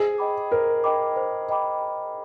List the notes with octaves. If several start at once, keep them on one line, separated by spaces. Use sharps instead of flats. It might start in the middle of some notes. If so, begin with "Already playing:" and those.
Already playing: G#4 C5
D#5 G5 B5 D6
A#4 C5
D#5 G5 B5 D6
C5
D#5 G5 B5 D6